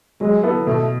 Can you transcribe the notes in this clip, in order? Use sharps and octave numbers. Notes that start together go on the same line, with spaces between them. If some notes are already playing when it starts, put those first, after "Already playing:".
F#3 G#3
B3 E4 A4
B2 A3